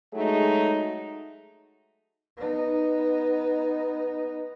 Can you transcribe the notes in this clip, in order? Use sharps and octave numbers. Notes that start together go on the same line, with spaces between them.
F#3 G#3 A3 D#4 G#4
B3 D#4